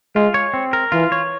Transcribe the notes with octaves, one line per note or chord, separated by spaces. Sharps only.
G#3 F4
C#5
C4
A#4
E3 F4
C#5